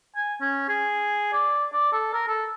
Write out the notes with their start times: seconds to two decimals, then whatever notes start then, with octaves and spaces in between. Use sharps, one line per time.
0.16 G#5
0.41 C#4
0.69 G#4
1.33 D5
1.73 D5
1.92 A4
2.13 A#4
2.28 A4